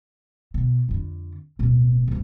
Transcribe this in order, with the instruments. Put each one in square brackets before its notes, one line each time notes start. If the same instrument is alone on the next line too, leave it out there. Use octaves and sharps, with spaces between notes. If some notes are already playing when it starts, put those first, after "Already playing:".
[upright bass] B2
F2 D3
D1 B2
D2 G2